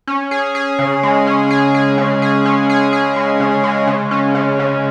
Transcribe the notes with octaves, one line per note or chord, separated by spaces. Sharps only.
C#4
G#4
G#4
C#3
G#3
C#4
G#4
G#4
C#3
G#4
C#4
G#4
G#4
G#3
C#3
G#3
C#3
C#4
C#3
C#3